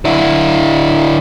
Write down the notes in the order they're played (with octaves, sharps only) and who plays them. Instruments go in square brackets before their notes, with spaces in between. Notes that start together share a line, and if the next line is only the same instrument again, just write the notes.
[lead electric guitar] D3 E4